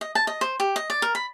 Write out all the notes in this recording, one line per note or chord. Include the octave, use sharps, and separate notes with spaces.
D#5
A5
D#5
C5
G4
D#5
D5
A#4
B5